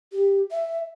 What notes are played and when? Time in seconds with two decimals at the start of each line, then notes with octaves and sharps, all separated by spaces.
0.12 G4
0.51 E5